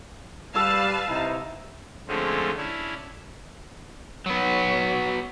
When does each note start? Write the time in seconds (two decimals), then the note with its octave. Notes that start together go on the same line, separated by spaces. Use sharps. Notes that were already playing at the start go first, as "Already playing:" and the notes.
0.56 G3 B4 F5 A5 E6
1.07 C3 D#4 E4
2.08 D3 F3 G#3 A3 C4 C#4
2.57 C#4 D4 E4
4.26 F#3 B3